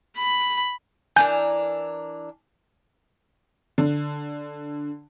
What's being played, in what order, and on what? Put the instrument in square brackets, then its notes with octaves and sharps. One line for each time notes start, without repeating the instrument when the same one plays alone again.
[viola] B5
[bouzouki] E3 D4 A#4 [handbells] G#5 G6
[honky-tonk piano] D3